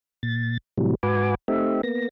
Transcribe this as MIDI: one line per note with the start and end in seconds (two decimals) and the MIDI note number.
0.23 0.58 46
0.23 0.58 93
0.77 0.95 45
0.77 0.95 48
0.77 0.95 52
0.77 0.95 54
0.77 0.95 55
1.03 1.35 44
1.03 1.35 66
1.03 1.35 71
1.03 1.35 80
1.03 1.35 86
1.48 1.81 57
1.48 1.81 60
1.48 1.81 63
1.48 1.81 67
1.48 1.81 76
1.83 2.09 58
1.83 2.09 59
1.83 2.09 94